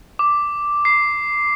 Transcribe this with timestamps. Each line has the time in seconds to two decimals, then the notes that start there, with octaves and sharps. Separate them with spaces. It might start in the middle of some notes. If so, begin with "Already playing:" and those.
0.19 D6
0.85 C7